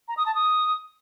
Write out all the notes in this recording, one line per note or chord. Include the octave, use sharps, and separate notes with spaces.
A#5
D#6
A5
D#6